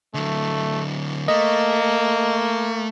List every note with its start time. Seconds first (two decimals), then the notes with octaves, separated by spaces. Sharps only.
0.14 D3 F#3 A3
1.28 A3 A#3 D#5